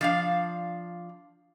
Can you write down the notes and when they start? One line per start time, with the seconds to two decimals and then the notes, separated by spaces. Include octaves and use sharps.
0.01 F3 D4 F5